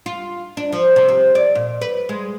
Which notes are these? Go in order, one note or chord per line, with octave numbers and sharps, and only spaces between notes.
F4
D4
F3
C3
C4
D5
A#2
B4
G#3